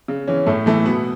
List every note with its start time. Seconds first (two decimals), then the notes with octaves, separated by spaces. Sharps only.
0.08 C#3
0.28 E3 C#4
0.46 A2 A3
0.66 E3 A3
0.85 B2 B3